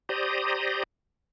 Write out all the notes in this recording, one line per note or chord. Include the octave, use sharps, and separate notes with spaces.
G4 C5 D5 A#5 D#6